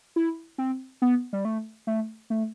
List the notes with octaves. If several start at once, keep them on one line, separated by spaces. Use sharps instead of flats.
E4
C4
B3
G3
A3
A3
A3